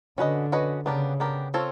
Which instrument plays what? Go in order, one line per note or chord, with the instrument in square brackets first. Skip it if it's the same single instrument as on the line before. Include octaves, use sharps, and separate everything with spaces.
[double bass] D3 [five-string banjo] C#4 F#4 B4 D#5
[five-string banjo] C#4 F#4 B4 D#5
[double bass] C#3 [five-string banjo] B3 D4 G4 A#4
[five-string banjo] B3 D4 G4 A#4
C4 F4 A4 C#5